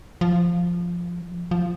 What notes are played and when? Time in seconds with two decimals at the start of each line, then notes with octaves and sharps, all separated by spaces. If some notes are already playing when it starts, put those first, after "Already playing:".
0.21 F3
1.51 F3